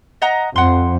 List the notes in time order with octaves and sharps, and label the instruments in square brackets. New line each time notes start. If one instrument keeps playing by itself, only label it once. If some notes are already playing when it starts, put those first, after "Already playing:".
[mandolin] D#5 F#5 A#5
[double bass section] F2 [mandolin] F#5 C6